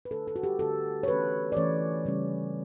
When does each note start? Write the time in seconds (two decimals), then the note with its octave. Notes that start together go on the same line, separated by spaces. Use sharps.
0.05 B4
0.11 D3 A3 D4 A4
0.28 A4
0.36 F#4
0.43 G4
0.59 D3 A3 D4 A4
1.03 C#5
1.08 E3 A3 C#4 B4
1.52 D5
1.57 E3 A3 C#4 C#5
2.05 C#3 G3 C#4